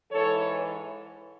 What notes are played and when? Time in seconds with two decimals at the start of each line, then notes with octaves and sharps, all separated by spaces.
0.10 G#2 E3 A4 C#5